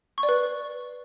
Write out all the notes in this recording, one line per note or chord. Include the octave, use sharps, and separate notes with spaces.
C#6
D5
B4